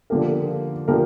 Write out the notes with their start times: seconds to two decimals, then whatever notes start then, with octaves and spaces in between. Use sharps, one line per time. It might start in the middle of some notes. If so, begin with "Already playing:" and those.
0.10 D3 F3 A#3 G4 A#4
0.88 D3 F3 A#3 G4 A#4